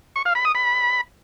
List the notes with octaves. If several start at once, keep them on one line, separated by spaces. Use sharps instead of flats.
C#6
F5
B5
D#6
B5